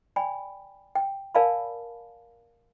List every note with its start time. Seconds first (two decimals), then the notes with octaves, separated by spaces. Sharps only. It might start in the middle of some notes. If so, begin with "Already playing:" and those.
0.16 D5 G5 G#5 B5
0.95 G5
1.35 A#4 D5 F5 G#5 A5 B5